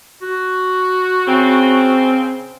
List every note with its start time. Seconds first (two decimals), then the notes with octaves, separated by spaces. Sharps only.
0.22 F#4
1.28 C#3 C4